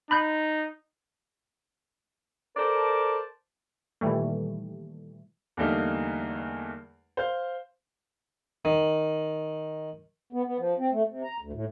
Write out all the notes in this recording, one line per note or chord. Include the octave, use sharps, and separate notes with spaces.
D#4 B5 F#6 G6
A4 A#4 C5 D5 A5
A#2 D#3 E3 G3 A3
E2 D3 G3 A3 A#3 D#4
C5 F5 G6
D#3
B3
B3
F3
C4
A3
C3
A#5
D2
A2